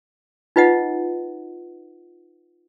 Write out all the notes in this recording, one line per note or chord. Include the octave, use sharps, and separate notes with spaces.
D#4 F4 B4 D#5 F#5